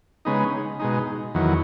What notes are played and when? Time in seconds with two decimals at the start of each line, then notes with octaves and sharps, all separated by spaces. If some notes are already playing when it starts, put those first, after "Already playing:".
0.25 C#3 G#3 B3 D#4
0.79 B2 G#3 D#4
1.34 E2 D#3 F#3